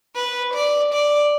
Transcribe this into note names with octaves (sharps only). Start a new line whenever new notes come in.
B4
D5
D5